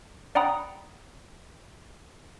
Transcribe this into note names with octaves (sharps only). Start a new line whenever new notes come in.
D5 F#5 G5 A#5 B5 D#6